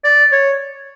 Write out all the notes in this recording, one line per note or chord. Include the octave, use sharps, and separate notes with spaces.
D5
C#5